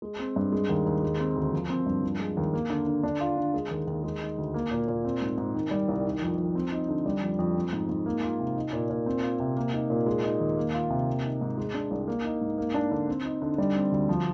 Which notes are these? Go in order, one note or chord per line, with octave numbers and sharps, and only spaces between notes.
G#3
C4
G2
G#3
D#2
D#2
G#3
C4
D2
F3
C4
G2
F3
G#3
D#2
A#3
D3
D3
D4
F4
D3
G#3
D#2
D#2
G#3
D#4
D2
A#3
A#2
A#2
C4
G#2
G#2
D#3
G3
C2
D#3
F2
F2
C4
D#4
D3
G3
F2
F2
C4
G#2
G#2
A#3
F4
C3
D#4
A#2
A#2
C4
F4
C3
A#3
D#4
A#2
G#3
D#4
D#2
A#3
F4
C3
A#3
D#4
G#2
G#3
D4
C2
A#3
D#4
G#2
A#3
D4
D3
C4
D#4
D3
G3
C4
D2
F3